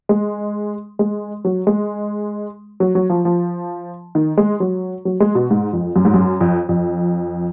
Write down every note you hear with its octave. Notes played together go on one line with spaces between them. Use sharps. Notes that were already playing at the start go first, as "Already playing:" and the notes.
G#3
G#3
F#3
G#3
F#3
F#3
F3
F3
D#3
G#3
F#3
F#3
G#3
B2
G#2
F2
F#2
G#2
F#2
F2
F2